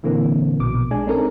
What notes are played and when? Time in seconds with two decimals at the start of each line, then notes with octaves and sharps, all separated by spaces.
0.03 A#2 D3 E3 A#3 C4
0.60 A#1 B2 D6
0.91 G#3 D4 G#5
1.07 G#3 C4 C#4 D#4 A4 A#4